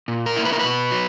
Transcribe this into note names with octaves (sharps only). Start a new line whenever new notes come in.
A#2
A#4
A#3 E4
B4
A#4
B2 B4
F#3